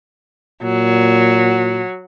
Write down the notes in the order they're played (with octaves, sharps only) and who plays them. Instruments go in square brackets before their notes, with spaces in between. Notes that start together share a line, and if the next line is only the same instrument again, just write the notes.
[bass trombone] A#2 [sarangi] F#3